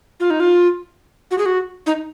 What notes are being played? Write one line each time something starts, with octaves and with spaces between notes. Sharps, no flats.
F4
D#4
F4
F#4
G#4
F#4
D#4